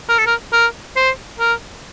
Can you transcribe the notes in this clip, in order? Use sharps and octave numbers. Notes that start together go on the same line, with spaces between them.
A#4
A4
A#4
A#4
C5
A#4